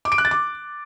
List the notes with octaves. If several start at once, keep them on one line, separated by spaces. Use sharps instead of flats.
D6
D7
F#6
A6
D6